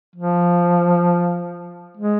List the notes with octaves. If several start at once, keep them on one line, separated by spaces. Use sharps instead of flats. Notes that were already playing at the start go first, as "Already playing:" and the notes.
F3
G#3